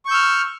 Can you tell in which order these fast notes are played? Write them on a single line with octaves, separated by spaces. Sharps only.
C#6 G6 E6 F6